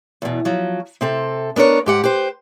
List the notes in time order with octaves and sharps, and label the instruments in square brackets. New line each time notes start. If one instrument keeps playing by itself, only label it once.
[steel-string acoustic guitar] E2 B2
F3 F#3
C3 C4 A4
B3 D4 A#4 C#5
G#2 G4 F#5
G4 B4 C5